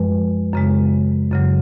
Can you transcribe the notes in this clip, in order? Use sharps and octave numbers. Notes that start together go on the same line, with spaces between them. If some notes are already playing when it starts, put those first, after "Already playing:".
Already playing: F#2 F3 G#3 B4
F#2 C#3 G#3
F#2 C#3 F#3